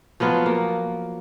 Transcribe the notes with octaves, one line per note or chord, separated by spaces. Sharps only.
F3 F#3 B3 F4
A#3